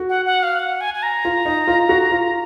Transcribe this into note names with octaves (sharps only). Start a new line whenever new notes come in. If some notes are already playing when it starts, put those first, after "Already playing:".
Already playing: F#4
F#5
F#5
F5
F#5
G#5
G#5
A#5
F4
D#4
F4
F#4
F4